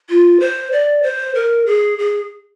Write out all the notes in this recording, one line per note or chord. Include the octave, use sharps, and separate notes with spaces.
F4
C5
D5
C5
A#4
G#4
G#4